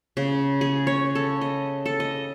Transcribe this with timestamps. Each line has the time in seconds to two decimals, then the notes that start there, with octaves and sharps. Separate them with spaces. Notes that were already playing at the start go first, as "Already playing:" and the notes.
0.17 C#3
0.61 G#4
0.87 C#5
1.15 A4
1.41 D#5
1.86 A4
2.00 D#5